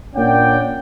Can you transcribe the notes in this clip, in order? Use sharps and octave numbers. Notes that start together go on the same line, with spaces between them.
A#2 C#4 D4 D5 F#5 G5